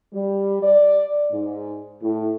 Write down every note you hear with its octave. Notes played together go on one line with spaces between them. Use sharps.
G3
D5
G#2
A2